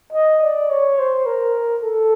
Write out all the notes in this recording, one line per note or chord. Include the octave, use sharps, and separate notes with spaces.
D#5
D5
C#5
C5
A#4
A4